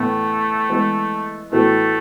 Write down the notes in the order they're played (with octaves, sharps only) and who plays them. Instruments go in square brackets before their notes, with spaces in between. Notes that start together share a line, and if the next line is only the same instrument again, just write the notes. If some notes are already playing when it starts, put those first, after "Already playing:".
Already playing: [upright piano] A2 E3 B3 [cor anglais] A3
[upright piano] E3 G#3 B3
[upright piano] A2 E3 B3 F#4 A4 [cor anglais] A3